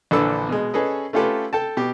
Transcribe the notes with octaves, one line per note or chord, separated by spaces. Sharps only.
A#1 D3 E3 A4 E6
B2 G#3
C#4 G#4 A4 B4 D#5
A3 C#4 F4 G4 A4 B4
A4 G5 A5
B2 G4